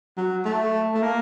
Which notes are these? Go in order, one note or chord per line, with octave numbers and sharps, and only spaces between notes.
F#3
A3
A3
A#3